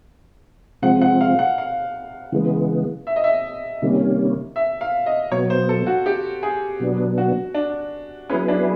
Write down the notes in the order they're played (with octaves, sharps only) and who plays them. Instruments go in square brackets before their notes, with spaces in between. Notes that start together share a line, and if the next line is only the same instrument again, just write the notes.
[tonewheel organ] C3 F3 G#3 C4 [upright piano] F#5
[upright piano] F#5
F5
F#5
F5
[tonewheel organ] C#3 E3 G#3 B3
[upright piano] E5
D#5
E5
[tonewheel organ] C3 D#3 G3 A#3 C#4
[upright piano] E5
F5
D#5
[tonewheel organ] B2 F#3 B3 [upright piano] C#5
[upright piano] C5
A4
F#4
G4
G#4
[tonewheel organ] B2 F#3 B3 D4
[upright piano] F#4
D4
[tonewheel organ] F#3 B3 E4 G#4 B4 [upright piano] C#4
[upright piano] D4